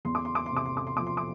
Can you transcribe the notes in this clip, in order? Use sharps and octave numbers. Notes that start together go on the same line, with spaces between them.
E2 C6
D6
C6
D6
C6
C3 D6
C6
D6
C6
F3 D6
C6
D6